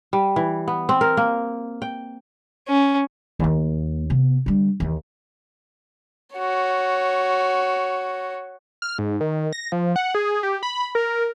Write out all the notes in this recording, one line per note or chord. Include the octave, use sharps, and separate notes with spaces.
G3
E3
B3
C4
A#4
A#3
G5
C#4
D#2 A#3
C3 B3
D3 G3
D#2 E3
F#4 C#5
F6
G#2
D#3
A#6
F3
F#5
G#4
G4
B5
A#4